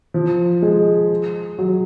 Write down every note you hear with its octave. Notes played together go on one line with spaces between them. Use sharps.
F3
G#3
F#3